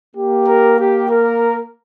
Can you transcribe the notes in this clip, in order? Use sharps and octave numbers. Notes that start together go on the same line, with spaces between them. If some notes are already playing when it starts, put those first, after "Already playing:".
A#3 G4
A#4
G4
A#4